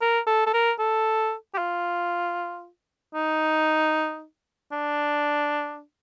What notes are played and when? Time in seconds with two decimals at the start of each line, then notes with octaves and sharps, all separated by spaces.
0.01 A#4
0.27 A4
0.47 A4
0.54 A#4
0.79 A4
1.54 G4
1.58 F4
3.15 D#4
4.72 D4